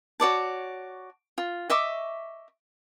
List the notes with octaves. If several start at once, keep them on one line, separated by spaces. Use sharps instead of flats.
F#4 C#5 D5 A5
F4
D#5 E5 C#6 D6